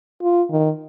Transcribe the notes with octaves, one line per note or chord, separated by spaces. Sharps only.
F4
D#3